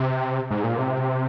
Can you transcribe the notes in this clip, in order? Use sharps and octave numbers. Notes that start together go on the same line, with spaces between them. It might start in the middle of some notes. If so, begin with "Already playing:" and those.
Already playing: C3
G#2
A#2
C3